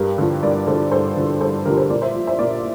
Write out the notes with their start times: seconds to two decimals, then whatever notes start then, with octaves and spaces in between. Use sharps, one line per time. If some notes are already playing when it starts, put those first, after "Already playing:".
Already playing: G2 G4 A#4
0.18 D3 F3
0.43 G2 A#4 D5
0.67 D3 F3 A4 C5
0.91 G2 A4 C5
1.16 D3 F3
1.41 G2 A4 C5
1.65 D3 F3 G4 A#4
1.77 A4 C5
1.90 A#2 A#4 D5
2.02 C5 E5
2.14 F3
2.27 C5 E5
2.39 A#2 A#4 D5